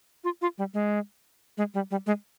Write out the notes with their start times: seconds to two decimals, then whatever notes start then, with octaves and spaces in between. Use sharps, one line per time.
0.24 F4
0.42 F4
0.58 G3
0.74 G#3
1.58 G#3
1.74 G3
1.91 G3
2.06 G#3